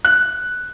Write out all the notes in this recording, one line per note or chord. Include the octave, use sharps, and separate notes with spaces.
F#6